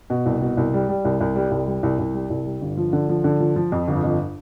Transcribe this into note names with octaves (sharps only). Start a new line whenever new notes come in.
B2
C2
B2
C2
G3
G3
C2
C2
G3
C2
G3
C2
C2
G3
C2
G3
G1
F3
D3
F3
D3
F3
F3
F2
G1
F2